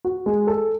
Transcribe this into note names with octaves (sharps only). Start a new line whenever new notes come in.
F#4
G#3
A4